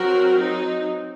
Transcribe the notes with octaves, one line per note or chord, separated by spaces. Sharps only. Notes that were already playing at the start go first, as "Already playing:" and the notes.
Already playing: F#3 C4 F#4 A#4
D#4